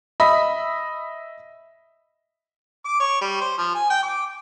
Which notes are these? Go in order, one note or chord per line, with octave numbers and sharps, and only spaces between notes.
D#5 E5 B5
D6
C#5
G3
C5
F3
G#5
G5
D6